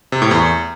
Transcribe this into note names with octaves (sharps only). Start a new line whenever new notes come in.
C3
A2
E2